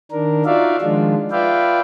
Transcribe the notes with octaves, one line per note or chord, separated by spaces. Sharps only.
D#3 D4 A#4
D#4 F4 F#4 D5 E5 F5
D#3 F3 G#3 D4 F4
F4 B4 D5 E5 F5 G5